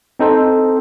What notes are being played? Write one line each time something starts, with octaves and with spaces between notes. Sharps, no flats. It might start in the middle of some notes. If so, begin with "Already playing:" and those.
C4 D#4 A4 C5